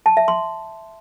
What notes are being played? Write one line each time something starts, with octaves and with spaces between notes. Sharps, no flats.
A5
E5
C6